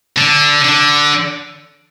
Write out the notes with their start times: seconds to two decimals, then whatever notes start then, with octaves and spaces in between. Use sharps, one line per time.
0.18 D3
0.64 D3